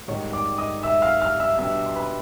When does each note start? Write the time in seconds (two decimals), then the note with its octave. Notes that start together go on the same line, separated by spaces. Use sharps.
0.08 G#2 D#3 G3 C#5 C#6
0.33 D5 D6
0.58 D#5 D#6
0.83 E5 E6
1.02 F5 F6
1.21 F5 F6
1.40 E5 E6
1.58 B2 G3 B3 D4 E5 E6
1.86 C6
1.96 B4 B5